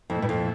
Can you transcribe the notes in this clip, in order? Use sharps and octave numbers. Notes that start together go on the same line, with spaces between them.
F2 A#2 A3 E4
G2
F2